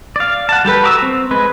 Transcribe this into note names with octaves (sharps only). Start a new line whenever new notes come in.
D5 F5
F#5 A5
G3 G4 A4 B4
F#4 A#5 D6 E6
C4
G#3 B4